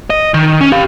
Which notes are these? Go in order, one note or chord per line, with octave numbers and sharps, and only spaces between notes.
D#5
D#3
C#4
G4 F5